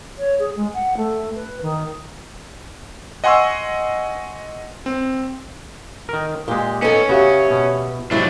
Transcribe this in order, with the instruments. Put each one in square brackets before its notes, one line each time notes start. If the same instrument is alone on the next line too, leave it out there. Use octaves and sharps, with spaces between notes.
[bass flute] C#5
G#4
G#3
F#5
A3
B4
D#3
[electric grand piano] D#5 F#5 G#5 C6 C#6 E6
C4
[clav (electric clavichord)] D#3 A#4
[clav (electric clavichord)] A#2 G#3 [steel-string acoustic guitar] G4
[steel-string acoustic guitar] B3 D#4 A4 [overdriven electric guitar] C#4
[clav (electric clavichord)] C#3 F#4 [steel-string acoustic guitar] B3 [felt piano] G4 E5
[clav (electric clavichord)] B2
[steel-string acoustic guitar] C3 G#3 E4 [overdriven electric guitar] F#3 D4